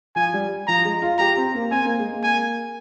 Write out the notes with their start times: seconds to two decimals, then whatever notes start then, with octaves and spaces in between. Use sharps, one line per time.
0.16 F3 G#5
0.33 G3
0.67 F3 A#5
0.84 G#3
1.02 F4
1.19 G4 A#5
1.37 C4
1.54 A#3
1.71 C4 G#5
1.85 A#3
1.99 G#3
2.12 A#3
2.23 G#5